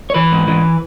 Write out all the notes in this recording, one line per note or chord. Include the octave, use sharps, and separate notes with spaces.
C#5
E3 B4
G#2
E3